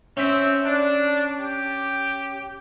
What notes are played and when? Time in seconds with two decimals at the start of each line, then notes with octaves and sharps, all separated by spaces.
0.17 C4 C#4 E5
0.64 D4
1.40 G4